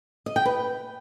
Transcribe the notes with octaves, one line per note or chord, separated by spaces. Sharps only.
D#5
G5
B4